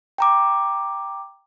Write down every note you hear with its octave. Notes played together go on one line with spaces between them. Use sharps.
G5 A#5 D6